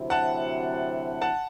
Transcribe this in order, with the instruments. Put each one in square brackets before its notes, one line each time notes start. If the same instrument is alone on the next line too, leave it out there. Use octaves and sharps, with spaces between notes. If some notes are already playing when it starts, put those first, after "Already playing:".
Already playing: [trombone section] D2 C3 F#3 C4 E4
[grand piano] F#5 A5
F#5 A5